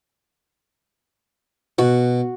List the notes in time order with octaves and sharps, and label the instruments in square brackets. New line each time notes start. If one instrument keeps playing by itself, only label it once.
[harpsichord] B2 [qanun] F#4